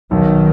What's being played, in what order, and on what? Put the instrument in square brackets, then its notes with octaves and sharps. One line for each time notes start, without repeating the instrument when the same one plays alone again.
[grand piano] B1 [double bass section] D#3